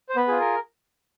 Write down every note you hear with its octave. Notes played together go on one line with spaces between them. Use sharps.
C5
B3 B4
F4 G#4
A#4